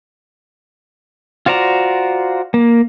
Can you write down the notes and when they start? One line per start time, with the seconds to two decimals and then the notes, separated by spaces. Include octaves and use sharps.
1.46 F4 F#4 C5 D5 A#5
2.54 A#3